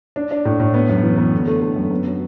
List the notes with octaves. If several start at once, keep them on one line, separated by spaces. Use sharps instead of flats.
D4
D4
A2
A2
B3
F#2
E3
B3
D3
A3
A3
F#2
B3
F#3